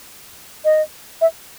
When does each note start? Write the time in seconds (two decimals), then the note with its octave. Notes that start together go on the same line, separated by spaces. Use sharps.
0.65 D#5
1.21 E5